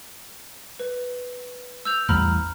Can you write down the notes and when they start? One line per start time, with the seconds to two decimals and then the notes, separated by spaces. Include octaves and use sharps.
0.80 B4
1.85 E6 G6 F7
2.09 A1 E2 G3 A#5 B5 F6